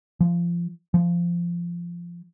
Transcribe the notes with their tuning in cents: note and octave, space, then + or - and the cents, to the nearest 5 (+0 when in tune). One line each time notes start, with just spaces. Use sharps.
F3 -20
F3 -15